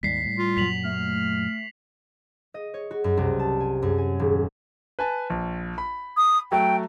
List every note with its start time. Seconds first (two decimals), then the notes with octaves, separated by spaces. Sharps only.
0.03 D#2 G#2 G3 B6 C7
0.25 A2
0.38 F4
0.57 F#2 A#2 F#3 B6 F7 F#7
0.84 A3 F6
2.54 D#5
2.74 C#5
2.91 F#4
3.04 F#2
3.17 C2
3.39 A5
3.60 G#5
3.82 F#2
3.98 G#5
4.19 D#1
4.99 B4 G#5 A5
5.30 A#1
5.78 B5
6.17 D#6
6.52 F#3 A3 G5